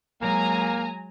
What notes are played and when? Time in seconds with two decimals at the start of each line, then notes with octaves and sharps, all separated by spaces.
0.21 F#3 G#3 A#3 G#5 A#5